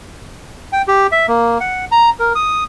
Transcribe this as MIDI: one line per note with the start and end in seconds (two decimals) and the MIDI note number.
0.72 0.82 79
0.88 1.07 67
1.12 1.26 76
1.28 1.58 58
1.60 1.85 78
1.91 2.10 82
2.19 2.33 70
2.35 2.64 87